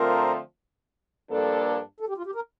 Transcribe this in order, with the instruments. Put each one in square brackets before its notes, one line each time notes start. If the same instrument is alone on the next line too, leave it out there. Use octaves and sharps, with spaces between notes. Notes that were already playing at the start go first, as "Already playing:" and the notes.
Already playing: [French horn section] D3 F3 A3 C4 F4 [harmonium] A#4
[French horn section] G2 F3 A#3 D4 A4
[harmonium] A4
G4
F4
G4
A#4